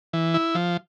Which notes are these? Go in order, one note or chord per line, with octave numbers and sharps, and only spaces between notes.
E3
E4
F3